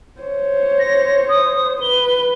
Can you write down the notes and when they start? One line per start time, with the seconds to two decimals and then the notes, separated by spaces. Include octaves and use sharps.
0.20 C5 C#5
0.79 A#6
1.29 D#6
1.82 B4 G7